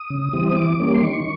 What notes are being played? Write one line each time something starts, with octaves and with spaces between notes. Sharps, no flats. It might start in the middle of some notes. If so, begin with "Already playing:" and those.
Already playing: D#6
C#3
E3 G3 C4
D#6
E3 D6
G3 A#3 C#4
C6
D#3 C#6